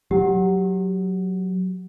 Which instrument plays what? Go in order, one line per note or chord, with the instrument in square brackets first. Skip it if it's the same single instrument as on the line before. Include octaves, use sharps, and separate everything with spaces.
[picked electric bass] F#3 [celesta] G4